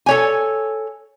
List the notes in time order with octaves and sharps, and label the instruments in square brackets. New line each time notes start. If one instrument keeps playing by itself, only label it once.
[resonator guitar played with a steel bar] A4 C#5 G#5